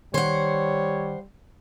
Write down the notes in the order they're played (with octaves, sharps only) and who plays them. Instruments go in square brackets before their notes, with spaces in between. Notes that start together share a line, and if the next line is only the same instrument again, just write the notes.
[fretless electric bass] D#3 [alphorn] G3 [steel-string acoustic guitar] C5 F#5 [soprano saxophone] C#5